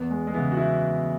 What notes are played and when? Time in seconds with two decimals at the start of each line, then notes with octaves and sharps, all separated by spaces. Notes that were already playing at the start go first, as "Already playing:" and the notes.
Already playing: E2 B3
0.10 G#3
0.27 G#3
0.34 C#3 E3 B3
0.52 F#4
0.57 E4